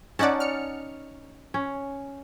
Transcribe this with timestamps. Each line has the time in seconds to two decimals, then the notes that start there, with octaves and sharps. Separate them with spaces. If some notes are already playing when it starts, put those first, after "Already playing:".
0.19 C#4 D#4 D5 F#5 A5
0.40 F6 C#7
1.54 C#4